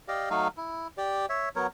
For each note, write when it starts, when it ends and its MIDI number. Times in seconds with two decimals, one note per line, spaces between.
0.08 0.29 67
0.08 0.29 74
0.08 0.29 75
0.08 0.29 77
0.30 0.48 54
0.30 0.48 57
0.30 0.48 63
0.30 0.48 77
0.57 0.88 64
0.98 1.26 67
0.98 1.26 74
1.30 1.49 73
1.30 1.49 76
1.56 1.67 54
1.56 1.67 59
1.56 1.67 70
1.56 1.67 73